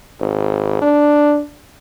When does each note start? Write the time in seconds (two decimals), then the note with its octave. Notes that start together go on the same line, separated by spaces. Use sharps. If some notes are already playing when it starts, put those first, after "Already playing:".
0.20 G#1
0.82 D4